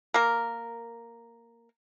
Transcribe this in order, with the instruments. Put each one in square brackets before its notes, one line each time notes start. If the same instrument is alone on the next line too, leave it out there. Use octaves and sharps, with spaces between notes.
[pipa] A#3 A#4